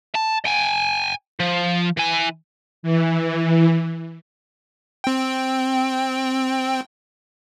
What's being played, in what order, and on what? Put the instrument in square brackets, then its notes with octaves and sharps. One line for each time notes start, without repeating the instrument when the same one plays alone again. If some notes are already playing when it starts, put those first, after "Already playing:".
[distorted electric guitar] A5
G5 G#5
F3
E3 G#5
[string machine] E3
[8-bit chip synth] C4 G5